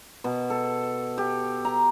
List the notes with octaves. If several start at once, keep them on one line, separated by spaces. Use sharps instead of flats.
B2
A4
G4
A#5